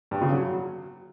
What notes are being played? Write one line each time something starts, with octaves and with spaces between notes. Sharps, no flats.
G2
C#3
F#3